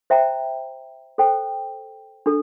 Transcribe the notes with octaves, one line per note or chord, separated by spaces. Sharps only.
C5 E5 G5 A#5
A4 C5 G5
D4 A4